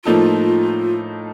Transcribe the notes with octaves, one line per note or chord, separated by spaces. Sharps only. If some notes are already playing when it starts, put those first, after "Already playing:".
A2 F3 A#3 D#4 F4 A4